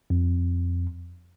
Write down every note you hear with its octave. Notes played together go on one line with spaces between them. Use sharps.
F2